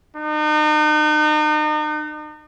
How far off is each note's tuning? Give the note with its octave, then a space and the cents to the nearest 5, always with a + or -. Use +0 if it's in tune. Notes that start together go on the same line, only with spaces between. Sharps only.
D#4 -40